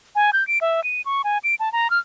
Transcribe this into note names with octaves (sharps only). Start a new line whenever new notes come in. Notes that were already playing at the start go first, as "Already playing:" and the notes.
G#5
G6
D7
E5
D#7
C#6
G#5
D7
A5
A#5
F6